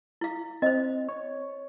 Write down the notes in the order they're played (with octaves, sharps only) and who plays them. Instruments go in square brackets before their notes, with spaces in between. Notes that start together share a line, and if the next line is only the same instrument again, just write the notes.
[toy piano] E4 F5
[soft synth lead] C4 [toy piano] C5 D#5
[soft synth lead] C#5